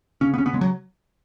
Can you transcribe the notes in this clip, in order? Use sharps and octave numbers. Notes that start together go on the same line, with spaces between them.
C#3 C#4
B3
C#3 C#4
B3
C#3 G#3
F#3